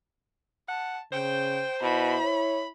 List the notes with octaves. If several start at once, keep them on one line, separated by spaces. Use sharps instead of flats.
F#5 A5
C#3 C5 G5
B2 E4 B5
C#5